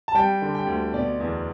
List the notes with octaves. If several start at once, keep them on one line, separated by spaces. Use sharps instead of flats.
A5
G3 G5
D3
G5
D2
B2 D5
E2